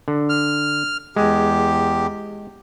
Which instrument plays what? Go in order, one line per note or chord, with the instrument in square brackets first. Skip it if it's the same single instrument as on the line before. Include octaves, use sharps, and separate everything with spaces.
[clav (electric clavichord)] D3
[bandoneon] F6
[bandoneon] E2 G4 [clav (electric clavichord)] G#3